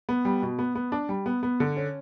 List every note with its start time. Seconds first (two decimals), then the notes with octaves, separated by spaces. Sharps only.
0.09 B3
0.25 G3
0.42 B2
0.59 B3
0.75 B3
0.92 D4
1.09 G3
1.26 B3
1.43 B3
1.60 D3
1.76 C#4